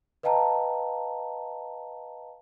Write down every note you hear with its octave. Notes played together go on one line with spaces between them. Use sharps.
B4 D#5 F5 G5 A5 A#5